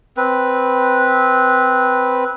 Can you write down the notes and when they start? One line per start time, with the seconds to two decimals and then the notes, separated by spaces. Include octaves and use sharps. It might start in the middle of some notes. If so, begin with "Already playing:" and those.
0.17 C4 B4